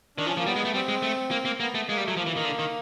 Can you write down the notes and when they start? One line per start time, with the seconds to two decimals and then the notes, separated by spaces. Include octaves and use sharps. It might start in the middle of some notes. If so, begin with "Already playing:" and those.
0.17 D#3 D4
0.26 F3 C#4
0.37 F3 A#3
0.46 G3 B3
0.56 G#3
0.65 A3
0.74 G3 C4
0.88 G#3
1.02 A3
1.31 A#3
1.45 A#3
1.60 A#3 B3
1.75 A3
1.89 G#3 A#3
1.97 G3
2.03 A3
2.08 F#3
2.17 F3 A#3
2.26 E3
2.31 A#3
2.37 D#3
2.45 D3
2.59 D#3